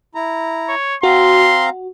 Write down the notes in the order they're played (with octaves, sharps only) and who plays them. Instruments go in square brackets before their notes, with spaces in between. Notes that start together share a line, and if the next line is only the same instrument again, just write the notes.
[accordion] E4 A#5
[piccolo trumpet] C#5
[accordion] C4 F5 A#5 [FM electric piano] F#4 [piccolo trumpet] C6